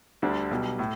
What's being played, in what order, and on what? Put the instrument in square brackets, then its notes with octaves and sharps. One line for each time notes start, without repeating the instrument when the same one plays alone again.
[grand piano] D2 D3 G3 D4
B1 B2 G3
A2